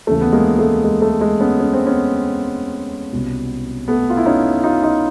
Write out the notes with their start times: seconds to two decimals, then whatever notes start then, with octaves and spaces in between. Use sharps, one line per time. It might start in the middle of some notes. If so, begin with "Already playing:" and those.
0.07 D#2 C#3 E3 A3
0.21 B3
0.33 G#3 A#3
0.59 A3
0.84 G#3
1.02 A3
1.21 G#3
1.40 B3 C#4
1.60 C#4
1.73 C4
1.86 B3 C#4
3.13 C2 B2
3.88 A3 B3
4.10 F4
4.17 E4
4.26 C#4 D#4
4.64 D#4 F4
4.83 D#4 F4